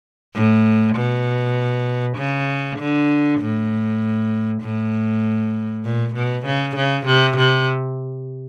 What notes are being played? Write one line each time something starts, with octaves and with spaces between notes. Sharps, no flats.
A2
B2
C#3
D3
A2
A2
A#2
B2
C#3
C#3
C3
C3